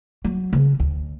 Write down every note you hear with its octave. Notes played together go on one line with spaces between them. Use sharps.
F#3
C#3
D2